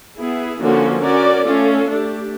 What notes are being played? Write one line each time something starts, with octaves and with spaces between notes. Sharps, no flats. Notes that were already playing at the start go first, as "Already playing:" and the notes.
B3 E4 G#4
D3 F3 A#3 C#4 F#4
C#4 F#4 A#4 D5
A3 C#4 F4 A4
A3 D4 G4